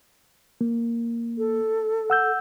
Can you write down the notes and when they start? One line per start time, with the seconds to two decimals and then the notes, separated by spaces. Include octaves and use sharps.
0.61 A#3
1.38 A4
2.10 F#5 E6 G6